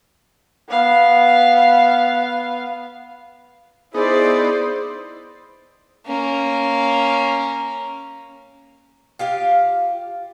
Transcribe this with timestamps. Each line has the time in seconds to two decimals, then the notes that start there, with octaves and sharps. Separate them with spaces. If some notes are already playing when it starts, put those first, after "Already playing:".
0.68 B3 F5
3.94 B3 D#4 E4 G#4 C5 D5
6.06 A#3 C#4
9.19 F4 G4 F5